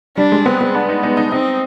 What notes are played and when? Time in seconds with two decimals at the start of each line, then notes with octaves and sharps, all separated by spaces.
0.17 G3 D4
0.32 G#3
0.46 B3 C4
0.61 B3
0.75 B3 D4
0.89 D#4
1.03 D#4
1.17 D#4
1.31 C4 D#4